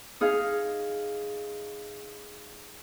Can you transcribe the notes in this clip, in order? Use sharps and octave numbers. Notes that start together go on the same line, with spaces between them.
D#4 G#4 F5